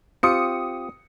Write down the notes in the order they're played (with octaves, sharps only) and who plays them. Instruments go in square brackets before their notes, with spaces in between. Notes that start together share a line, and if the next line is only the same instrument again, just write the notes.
[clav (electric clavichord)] C4 F4 G4 [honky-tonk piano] D#6 C#7